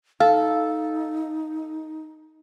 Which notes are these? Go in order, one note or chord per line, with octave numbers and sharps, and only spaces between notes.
D#4 A4 F5